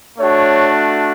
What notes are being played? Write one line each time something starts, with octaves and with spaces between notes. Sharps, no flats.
A3 D4 F#4 C#5